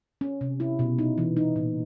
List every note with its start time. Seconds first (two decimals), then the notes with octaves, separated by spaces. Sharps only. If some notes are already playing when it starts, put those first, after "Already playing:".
0.21 C#4
0.41 C3
0.60 E4
0.79 B2
0.99 D#4
1.18 E3
1.37 D#4
1.56 A#2